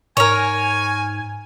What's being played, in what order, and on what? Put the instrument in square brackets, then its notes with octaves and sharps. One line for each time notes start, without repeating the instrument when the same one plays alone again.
[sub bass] G#2 [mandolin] A#4 C#5 [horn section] G#5